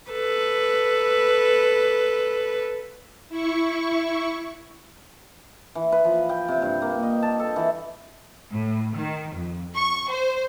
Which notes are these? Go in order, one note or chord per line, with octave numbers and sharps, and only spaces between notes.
A4 B4
E4 C#6
E3
B4
F3
G5
C3
G2
A#3
D#5
A5
A4
E3
A2
D#3
F2
C#6
C5